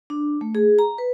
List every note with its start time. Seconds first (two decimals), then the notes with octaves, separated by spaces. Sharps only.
0.10 D4
0.41 A3
0.55 G#4
0.79 A#5
0.98 B4